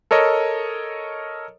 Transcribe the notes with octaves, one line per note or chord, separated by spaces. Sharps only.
A4 A#4 C#5 D#5